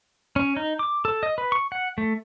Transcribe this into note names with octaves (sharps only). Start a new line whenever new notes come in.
C#4
D#4
D6
A4
D#5
B4
C#6
F#5
A3